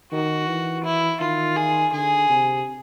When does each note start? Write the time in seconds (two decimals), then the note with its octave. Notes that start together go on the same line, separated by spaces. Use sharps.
0.12 D#3 F#4
0.47 E3
0.84 E4
1.20 D#3 F4
1.56 G#4
1.93 D3 G#4
2.29 C3